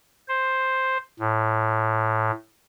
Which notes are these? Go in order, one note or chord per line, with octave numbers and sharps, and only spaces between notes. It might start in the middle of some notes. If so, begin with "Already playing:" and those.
C5
A2